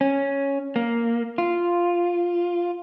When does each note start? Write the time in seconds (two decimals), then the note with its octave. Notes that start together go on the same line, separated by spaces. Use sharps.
0.01 C#4
0.76 A#3
1.38 F4